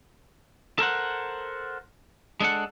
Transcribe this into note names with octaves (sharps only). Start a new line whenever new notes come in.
A4 A#4 C5 F#5
G#3 D4 A4 F#5